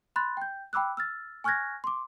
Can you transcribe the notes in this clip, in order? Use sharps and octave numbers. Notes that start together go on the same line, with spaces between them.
B5 C6 F#6 A6
G5 G6
G5 B5 D6 E6 F#6
E6 F6 A6
G#5 C#6 F6 F#6 G#6 A#6
C6 D6